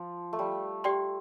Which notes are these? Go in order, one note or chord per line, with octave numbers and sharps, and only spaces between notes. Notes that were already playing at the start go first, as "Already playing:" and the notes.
Already playing: F3
A3
G3
G4 D5 G5 C6